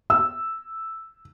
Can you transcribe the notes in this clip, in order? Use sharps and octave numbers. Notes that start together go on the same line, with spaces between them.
E6